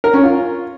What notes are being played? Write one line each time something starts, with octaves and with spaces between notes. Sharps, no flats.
A#4
C#4
F4